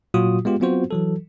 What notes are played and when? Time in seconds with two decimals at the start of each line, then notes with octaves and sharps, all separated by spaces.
0.14 A#2 F#3 F4 F#4 D#6
0.45 G#3 B3 F4 G4
0.60 F#3 B3 C4 F4 F#4 C5
0.91 E3 F#3 A4